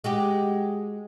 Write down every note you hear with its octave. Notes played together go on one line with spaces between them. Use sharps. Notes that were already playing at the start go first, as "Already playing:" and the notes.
G#3 F#4 G4